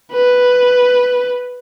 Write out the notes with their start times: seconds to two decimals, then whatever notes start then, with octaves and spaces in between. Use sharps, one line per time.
0.12 B4